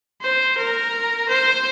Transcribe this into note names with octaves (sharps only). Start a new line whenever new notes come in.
C5
A#4
C5